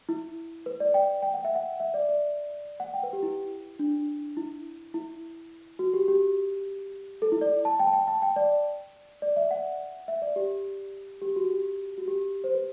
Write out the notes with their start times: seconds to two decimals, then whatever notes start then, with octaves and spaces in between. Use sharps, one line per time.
0.09 E4
0.66 B4
0.80 D5
0.94 G5
1.22 G5
1.34 F#5
1.45 E5
1.56 F#5
1.80 E5
1.94 D5
2.09 D5
2.80 F#5
2.94 G5
3.03 B4
3.13 G4
3.23 E4
3.79 D4
4.37 E4
4.94 E4
5.79 F#4
5.94 G4
6.08 G4
7.22 A4
7.32 E4
7.41 D5
7.65 A5
7.79 G5
7.87 A5
7.93 G5
8.07 A5
8.22 G5
8.36 D5
9.22 D5
9.36 E5
9.51 F#5
10.08 E5
10.22 D5
10.36 G4
11.22 G4
11.36 F#4
11.50 G4
11.98 F#4
12.08 G4
12.44 C5
12.54 B4